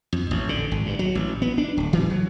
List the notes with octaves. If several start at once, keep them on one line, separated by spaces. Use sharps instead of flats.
F2
A1
D3
G#1
G2
F#3
A1
B3
D4
D1
E3
F#3